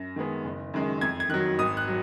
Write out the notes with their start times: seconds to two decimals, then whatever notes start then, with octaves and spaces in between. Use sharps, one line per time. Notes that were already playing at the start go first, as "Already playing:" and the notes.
Already playing: F#2 A#6
0.16 D#3 G#3 B3
0.44 F#1
0.74 F#2 D#3 G#3
1.01 F2 G#6
1.20 G#6
1.29 D#3 F#3 F#6
1.59 G#1 D#6
1.77 F#6
1.88 F#3